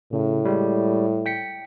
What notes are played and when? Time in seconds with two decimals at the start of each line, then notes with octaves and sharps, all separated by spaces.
0.13 A2 C#3
0.45 G3 G#3
1.26 G5 B6 C#7